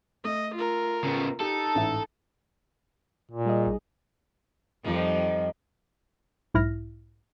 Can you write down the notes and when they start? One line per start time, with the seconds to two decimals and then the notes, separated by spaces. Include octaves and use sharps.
0.24 A3 D#5
0.55 F4 A#4
1.04 C#3 B3
1.40 D#4 G4 A4
1.75 A1 G#2 E5
3.31 A#2
3.46 G3 G#4 D#5
3.63 A1 D#4
4.84 F2 D#3 F3 G3
6.54 B1 G#2 E4 F6 A#6